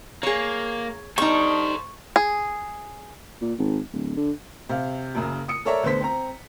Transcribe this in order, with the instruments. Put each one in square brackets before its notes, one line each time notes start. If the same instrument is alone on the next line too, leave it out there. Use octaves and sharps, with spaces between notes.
[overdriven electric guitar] A#3 [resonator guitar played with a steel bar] G#4 C#5
[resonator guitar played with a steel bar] G3 D4 D#4 [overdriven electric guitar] A4 C5 [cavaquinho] C#6
[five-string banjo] G#4
[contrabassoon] A#2
G#1
D1
D3
[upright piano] C3 F5
F#1 F#2 C#3
D#6 C#7
A4 A#4 C#5 D5 E5 A#5
D2 D3 B3 C5 B6
C4 A#5